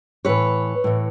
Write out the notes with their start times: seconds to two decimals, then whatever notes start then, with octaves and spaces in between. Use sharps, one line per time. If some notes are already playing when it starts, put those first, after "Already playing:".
0.25 A2 E3 B4 C#5
0.84 A2 E3